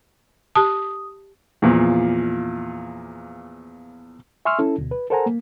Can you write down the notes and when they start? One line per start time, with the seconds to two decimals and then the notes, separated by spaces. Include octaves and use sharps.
0.55 G4 A5 D#6
1.62 E2 A#2 F3
4.45 E5 G#5 C6 C#6 E6 F6
4.59 C#4 E4 A4
4.78 D2 B2
4.91 B4
5.10 A4 A#4 C5 F#5 G#5 A#5
5.26 A#3